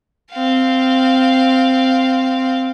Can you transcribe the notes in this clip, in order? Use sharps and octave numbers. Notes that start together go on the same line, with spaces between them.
C4 F5